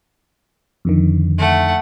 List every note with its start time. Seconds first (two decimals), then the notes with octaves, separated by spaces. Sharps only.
0.85 F2 D3 D#3
1.38 A3 F#5